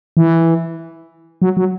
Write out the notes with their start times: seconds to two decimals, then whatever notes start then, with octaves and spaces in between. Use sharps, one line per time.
0.17 E3
1.42 F#3
1.57 F#3